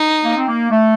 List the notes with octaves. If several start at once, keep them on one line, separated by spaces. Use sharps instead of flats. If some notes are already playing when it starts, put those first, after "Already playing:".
Already playing: D#4
A#3
C4
A#3
A3